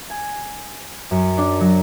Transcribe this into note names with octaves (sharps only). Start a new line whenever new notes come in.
G#5
F#2
D4
F#3